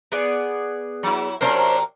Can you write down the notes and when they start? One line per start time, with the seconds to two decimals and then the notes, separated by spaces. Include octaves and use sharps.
0.12 B3 G#4 D5
1.03 F#3 E4
1.41 C3 F#3 C#4 D4 A#4 C5